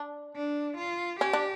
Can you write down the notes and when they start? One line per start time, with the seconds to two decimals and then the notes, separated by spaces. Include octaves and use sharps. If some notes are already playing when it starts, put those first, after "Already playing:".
Already playing: D4
0.36 D4
0.78 F4
1.21 C#4 G4
1.33 D4